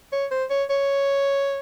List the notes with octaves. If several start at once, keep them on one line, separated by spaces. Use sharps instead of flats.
C#5
C5
C#5
C#5